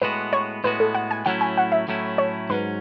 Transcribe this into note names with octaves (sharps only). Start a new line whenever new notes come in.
A2 G#3 B3 F#4 B4
C#5
A2 G#3 B3 F#4 B4
A4
F#5
G#5
A2 F#3 A3 C#4 E4 F#5
G#5
F#5
E5
A2 F#3 A3 C#4 E4
C#5
G#2 F#3 C#4 B4